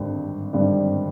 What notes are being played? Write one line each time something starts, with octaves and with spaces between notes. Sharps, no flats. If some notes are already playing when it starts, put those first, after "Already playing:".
Already playing: G#1 G2 D3 G3 C4
G#1 G2 D3 G3 C4